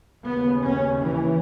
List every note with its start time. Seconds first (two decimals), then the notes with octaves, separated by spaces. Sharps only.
0.24 D#2 C#3 B3
0.62 C#4
1.01 E3